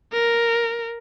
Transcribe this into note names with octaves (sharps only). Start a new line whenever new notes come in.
A#4